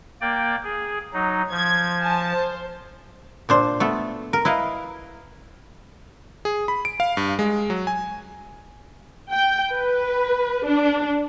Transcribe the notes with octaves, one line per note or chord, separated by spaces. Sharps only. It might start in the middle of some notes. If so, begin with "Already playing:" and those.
A#3 D5 G5
G#4
F#3 D#4
F3 G#6
G#5 A5
C5
A#2 D4 C5
A3 B3 A4
A#4
E4 B4 D#5 F5
G#4
B5
D7
F5
G2
G#3
F#3
G#5
G5
B4
D4